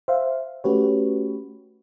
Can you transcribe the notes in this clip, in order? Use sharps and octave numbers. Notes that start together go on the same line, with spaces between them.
C5 E5 F5
A3 C#4 F#4 G4 B4 C#5